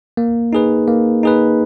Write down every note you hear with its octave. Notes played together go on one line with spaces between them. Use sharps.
A#3
D#4 G#4 B4
A#3
D#4 G#4 B4